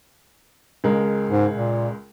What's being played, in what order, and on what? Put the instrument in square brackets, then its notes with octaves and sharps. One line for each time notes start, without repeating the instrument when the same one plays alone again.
[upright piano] C#2 G#3 A#4
[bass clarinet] G#2
A#2